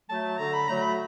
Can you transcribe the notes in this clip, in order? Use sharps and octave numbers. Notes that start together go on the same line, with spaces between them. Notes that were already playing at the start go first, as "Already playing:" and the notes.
F#3 A3 A5
D3 A#5
B5
F#3 A3 A#5
B5